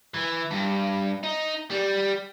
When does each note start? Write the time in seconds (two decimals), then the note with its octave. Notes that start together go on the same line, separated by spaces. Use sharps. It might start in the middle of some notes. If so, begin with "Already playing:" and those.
0.14 E3
0.51 G2
1.23 D#4
1.70 G3